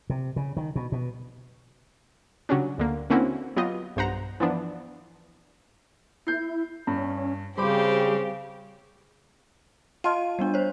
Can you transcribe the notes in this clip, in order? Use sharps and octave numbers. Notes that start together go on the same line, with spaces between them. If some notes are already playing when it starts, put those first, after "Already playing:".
C3
C#3
D#3
B2
B2
C#3 F#3 G3 C#4 D4
D2 D3 A#3
D3 A#3 C4 C#4 E4 F#4
F#3 B3 F4 G4 D#5
B1 G2 C5 F#5 A#5
E3 F3 B3 D4
E4 G6 C7
G2 C#4
C#3 G3 C4 G4 C5 B5 D6
F4 D#5 A5 D#7
G3 B3 D4
C5 C#5